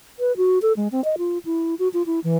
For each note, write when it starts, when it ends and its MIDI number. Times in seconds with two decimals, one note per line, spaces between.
0.19 0.36 71
0.37 0.59 66
0.62 0.73 69
0.77 0.88 56
0.92 1.04 60
1.05 1.16 75
1.18 1.38 65
1.45 1.75 64
1.79 1.88 66
1.94 2.03 65
2.06 2.20 64
2.24 2.38 52